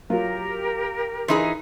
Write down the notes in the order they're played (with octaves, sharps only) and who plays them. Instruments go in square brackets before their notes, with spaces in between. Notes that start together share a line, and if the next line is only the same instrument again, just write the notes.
[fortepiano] F#3 F4 [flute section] G4 A#4
[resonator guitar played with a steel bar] E3 D#4 G#4 [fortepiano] C6